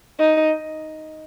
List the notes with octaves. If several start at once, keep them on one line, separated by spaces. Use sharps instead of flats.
D#4